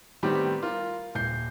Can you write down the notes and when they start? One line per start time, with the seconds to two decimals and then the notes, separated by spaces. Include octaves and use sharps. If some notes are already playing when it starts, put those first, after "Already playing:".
0.23 A2 D#3 G3 B3 C4 G4
0.63 F4 A#4
1.15 D#1 G6 C7